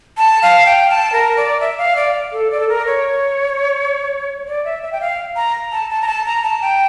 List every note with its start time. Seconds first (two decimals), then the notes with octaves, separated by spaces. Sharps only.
0.17 A5
0.42 F5
0.66 G5
0.90 A5
1.13 A#4
1.37 D5
1.60 E5
1.78 F5
1.97 D5
2.32 A4
2.51 D5
2.60 A4
2.69 A#4
2.87 C#5
4.47 D5
4.65 E5
4.83 E5
4.92 G5
5.01 F5
5.36 A#5
5.72 A5
5.90 A5
6.02 A#5
6.08 A5
6.26 A#5
6.43 A5
6.62 G5